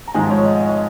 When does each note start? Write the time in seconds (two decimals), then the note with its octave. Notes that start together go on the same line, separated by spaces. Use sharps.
0.08 A#5
0.15 G#1 G#2 F3 G#3 D#4 G#5
0.30 C#5
0.45 D#5
0.56 D#5
0.60 C#5